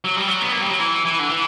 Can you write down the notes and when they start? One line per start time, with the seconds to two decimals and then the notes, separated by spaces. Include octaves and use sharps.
0.04 F#3
0.16 G3
0.28 F#3
0.42 B3
0.52 A#3
0.61 G3
0.70 F#3
0.80 E3
1.05 E3
1.19 D3
1.30 E3